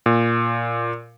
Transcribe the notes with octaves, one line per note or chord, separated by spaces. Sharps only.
A#2